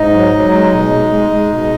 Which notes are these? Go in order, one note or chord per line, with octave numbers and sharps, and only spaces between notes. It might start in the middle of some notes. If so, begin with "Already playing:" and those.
Already playing: G#2 D#4 D#5
F#3
F#3
G#3
B2
G#3
G#3
G#3
B2